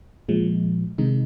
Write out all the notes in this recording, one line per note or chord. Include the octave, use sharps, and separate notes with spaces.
A#2 F3 G#3
C3 D#3 G#3 D#4